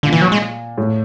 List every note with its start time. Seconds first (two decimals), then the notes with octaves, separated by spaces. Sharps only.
0.03 A#2 D3
0.13 E3
0.21 F#3
0.32 G#3
0.78 A2